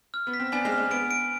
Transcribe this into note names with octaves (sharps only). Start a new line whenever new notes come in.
F6
B3
B6
C4
B3 D4 G#5
G#3 C4
F6
G#3
B3 D7
D7